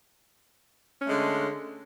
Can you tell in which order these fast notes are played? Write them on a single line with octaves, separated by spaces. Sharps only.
C#4 A3 G#3 D3